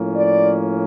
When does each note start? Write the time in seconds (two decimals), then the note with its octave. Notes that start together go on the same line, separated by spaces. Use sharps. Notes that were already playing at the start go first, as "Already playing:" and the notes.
Already playing: A2 F3 A#3 C#4
0.16 D5